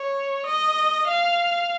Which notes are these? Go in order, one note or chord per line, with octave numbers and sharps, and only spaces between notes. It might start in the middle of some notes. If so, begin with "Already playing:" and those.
Already playing: C#5
D#5
F5